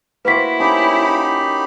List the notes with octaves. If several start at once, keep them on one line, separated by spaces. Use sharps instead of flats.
A#3 E4 F#4 B4 C5 B6
C#4 D#4 G4 B5